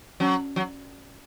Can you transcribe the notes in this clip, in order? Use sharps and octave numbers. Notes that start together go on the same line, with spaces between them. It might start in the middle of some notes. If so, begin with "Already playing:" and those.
F#3 C#4
F#3